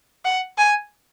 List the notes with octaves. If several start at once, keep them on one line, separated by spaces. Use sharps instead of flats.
F#5
G#5